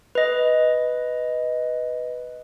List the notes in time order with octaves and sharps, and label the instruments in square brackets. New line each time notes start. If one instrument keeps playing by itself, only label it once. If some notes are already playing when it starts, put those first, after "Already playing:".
[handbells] B4 D#5